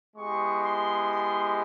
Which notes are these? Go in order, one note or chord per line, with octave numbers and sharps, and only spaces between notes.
G#3 B3 E4 G4 C#6
C6
C6